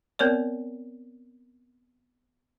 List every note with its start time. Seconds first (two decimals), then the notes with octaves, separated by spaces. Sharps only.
0.19 B3 C4 A#4 C#5 D5